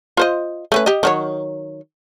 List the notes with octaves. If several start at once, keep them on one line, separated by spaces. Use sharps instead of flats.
F4 C5 D#5
A3 C#4 B4
G4 D#5
D#3 F#3 C#5